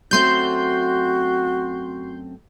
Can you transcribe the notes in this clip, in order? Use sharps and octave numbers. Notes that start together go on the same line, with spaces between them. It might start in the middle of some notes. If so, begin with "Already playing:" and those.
F#2 A3 C4 F#4 C6 G6